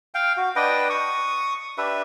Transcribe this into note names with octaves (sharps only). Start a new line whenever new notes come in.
F5 G5
F#4
D4 B4 D#5 G5
C#6 D#6
D4 G4 B4 E5